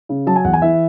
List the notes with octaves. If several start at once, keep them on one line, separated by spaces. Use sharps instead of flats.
C#3
F#3 A5
G#5
E2 F#5
G#5
E3 E5